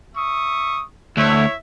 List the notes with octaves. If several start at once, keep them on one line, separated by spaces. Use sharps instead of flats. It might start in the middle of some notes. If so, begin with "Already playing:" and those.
E5 C#6 D#6
D2 E4 C#5 E5